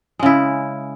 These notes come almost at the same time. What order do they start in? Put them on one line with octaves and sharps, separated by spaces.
G#3 C#3 E4